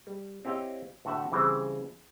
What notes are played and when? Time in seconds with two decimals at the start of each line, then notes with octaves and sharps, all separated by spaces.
0.07 G3
0.45 C4 E4 G4 C#5 D#5 F5
1.05 A2 D3 A3 F#4 E5 F#5
1.32 C#3 E3 G3 C4 G#4 C5